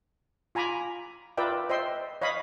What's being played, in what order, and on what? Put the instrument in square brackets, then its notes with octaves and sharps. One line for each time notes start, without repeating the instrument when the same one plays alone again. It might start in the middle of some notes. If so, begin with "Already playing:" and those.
[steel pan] F4 G#5 A#5 B5 D6
F4 A#4 B4 D5 E5 G5
C5 D#5 E5 G5 C6
C#5 D#5 F5 B5 D#6